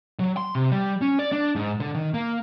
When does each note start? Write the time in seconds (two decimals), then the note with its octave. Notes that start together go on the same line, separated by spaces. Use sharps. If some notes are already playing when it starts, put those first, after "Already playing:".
0.19 F#3
0.37 C6
0.55 C3
0.71 G3
1.01 C#4
1.19 D5
1.32 D4
1.55 G#2
1.80 D3
1.95 D#3
2.14 A#3